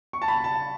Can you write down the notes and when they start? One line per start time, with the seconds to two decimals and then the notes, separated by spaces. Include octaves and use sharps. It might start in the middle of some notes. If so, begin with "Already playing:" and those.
0.13 C#6
0.22 A5
0.28 B5
0.44 A5